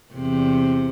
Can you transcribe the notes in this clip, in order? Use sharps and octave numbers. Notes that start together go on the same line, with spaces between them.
E2 C3